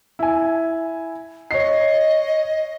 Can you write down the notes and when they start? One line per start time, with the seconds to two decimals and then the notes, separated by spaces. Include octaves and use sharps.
0.19 E4 G#5
1.51 C#5 D#5 C7